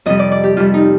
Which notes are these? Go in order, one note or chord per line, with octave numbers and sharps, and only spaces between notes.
F2 C3 G3 D#5
D5
D5
G4
F2 C3 G3 F4
D#4